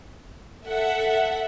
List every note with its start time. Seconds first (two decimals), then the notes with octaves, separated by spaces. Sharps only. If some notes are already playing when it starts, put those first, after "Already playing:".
0.66 A4 E5 F#5